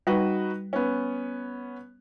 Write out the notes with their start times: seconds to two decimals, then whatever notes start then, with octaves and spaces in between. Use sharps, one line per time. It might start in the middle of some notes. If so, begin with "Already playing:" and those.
0.07 G3 D#4 F#4 B4
0.73 B3 C#4